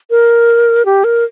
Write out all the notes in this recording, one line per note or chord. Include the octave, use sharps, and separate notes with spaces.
A#4
G4
A#4